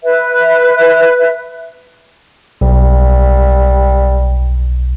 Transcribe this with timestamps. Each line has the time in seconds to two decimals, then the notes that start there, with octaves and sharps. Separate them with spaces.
0.03 B4 E5
2.61 B1 G3